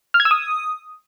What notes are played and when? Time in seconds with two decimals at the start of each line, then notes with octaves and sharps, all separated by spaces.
0.14 F6
0.20 G#6
0.25 E6
0.31 D#6